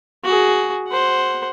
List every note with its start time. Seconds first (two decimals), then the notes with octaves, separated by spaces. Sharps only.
0.24 F#4 G#4
0.88 C5 F#5